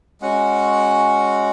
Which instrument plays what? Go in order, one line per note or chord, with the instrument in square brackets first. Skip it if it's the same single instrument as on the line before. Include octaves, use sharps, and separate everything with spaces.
[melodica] G#3 C#4 F#4 F#5